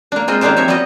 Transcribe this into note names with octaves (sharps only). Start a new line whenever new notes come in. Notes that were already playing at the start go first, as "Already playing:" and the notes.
A#3 D4
G#3 C4 F4 C5 D#5
D#3 A#3 C#4 D4 G4 C5
F3 C4 C#5 E5
G3 B3 F#4 B4 D#5